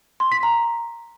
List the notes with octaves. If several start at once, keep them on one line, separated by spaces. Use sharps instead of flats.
C6
B6
A#5